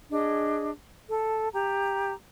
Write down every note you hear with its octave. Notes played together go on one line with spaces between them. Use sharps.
D4 G#4 D#5
A4
G4 A#5